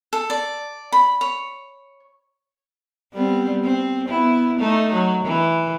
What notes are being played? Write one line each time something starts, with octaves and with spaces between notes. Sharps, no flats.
A4
D5
B5
C#5
G3 B3 C4
C4
B3 E4
A3 D#4
F#3
E3